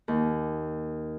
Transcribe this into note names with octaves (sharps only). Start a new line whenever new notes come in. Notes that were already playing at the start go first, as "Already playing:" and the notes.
D#2